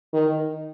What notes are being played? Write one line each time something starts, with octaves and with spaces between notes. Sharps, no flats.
D#3